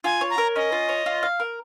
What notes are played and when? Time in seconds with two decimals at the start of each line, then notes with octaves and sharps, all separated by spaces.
0.04 F4 G#5
0.21 C#5
0.30 A#5
0.38 A#4
0.56 C#4 D#5
0.72 F4
0.89 C#5
1.06 F4
1.23 F5
1.40 A#4